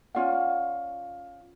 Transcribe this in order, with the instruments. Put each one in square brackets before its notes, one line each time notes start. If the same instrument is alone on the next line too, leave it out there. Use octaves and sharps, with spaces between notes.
[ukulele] C#4 F4 D5 F#5